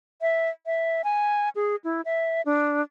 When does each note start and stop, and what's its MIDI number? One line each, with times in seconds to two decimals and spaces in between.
0.22 0.49 76
0.66 1.02 76
1.04 1.49 80
1.55 1.76 68
1.84 2.01 64
2.05 2.42 76
2.46 2.82 62